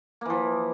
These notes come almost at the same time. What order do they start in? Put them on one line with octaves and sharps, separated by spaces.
A#3 E3 F3